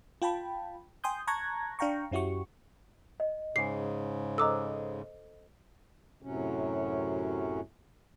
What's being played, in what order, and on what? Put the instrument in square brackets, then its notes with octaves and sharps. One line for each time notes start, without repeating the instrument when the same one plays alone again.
[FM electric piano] F4 G5 A5 B5
G5 G#5 C6 D#6 G6
A5 A#5 C#6 F#6 G#6 A#6
D4 F5 G5 A#5 C#6
F#2 C#4 E4 F#4 G4 C#6
[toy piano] D#5
[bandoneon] G#2 C#3 [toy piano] G#4 G#5 [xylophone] C7
[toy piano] A4 C5 D#5 [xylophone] A#5 D6 E6
[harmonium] F#2 A2 C3 F#3 C#4